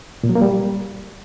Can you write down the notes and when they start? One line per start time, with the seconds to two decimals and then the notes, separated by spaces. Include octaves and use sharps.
0.23 A#2
0.29 F#3
0.35 A#3
0.41 G3